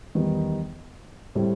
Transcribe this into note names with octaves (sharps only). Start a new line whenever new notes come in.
E2 D#3 G3 B3 D#4
A2 G3 C4